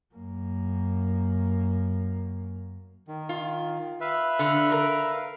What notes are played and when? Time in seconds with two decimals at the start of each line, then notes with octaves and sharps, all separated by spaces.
0.14 F#2 A#3
3.08 D#3
3.29 F4
4.01 B4 E5 F5
4.39 D3
4.72 A#4